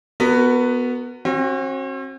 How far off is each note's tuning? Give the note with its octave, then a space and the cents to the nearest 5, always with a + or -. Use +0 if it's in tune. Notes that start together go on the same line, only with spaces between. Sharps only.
B3 +0 F#4 +0 A#4 -35
C4 +45 F#4 +0